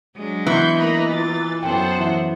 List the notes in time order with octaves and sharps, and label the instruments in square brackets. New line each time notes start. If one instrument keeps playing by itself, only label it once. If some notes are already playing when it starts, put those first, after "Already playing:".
[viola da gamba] F#3 G#3 D4
[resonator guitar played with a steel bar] E3 [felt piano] B3 [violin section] C6 C#6 G6
[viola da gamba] A#3 D#4 A#4 [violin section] D#5 A#5 B5
[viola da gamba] F4 [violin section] A6
[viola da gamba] F#2 B3 [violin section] A4 C5 F#5 [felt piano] G5
[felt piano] E3